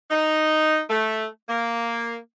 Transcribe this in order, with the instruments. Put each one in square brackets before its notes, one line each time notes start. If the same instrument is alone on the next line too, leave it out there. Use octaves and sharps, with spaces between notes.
[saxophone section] D#4
A3
A#3